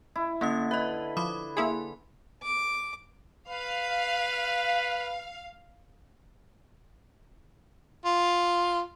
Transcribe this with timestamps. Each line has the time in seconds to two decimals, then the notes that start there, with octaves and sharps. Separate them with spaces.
0.16 E4
0.41 D3 A#3 C#4 D#6
0.71 B4 D#5 E5
1.17 F3 B5 D6 D#6
1.57 A#3 E4 G#4 G#5 C6
2.43 D6
3.49 B4 F5
8.05 F4